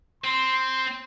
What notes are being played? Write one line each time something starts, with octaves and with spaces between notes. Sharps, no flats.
C4 C6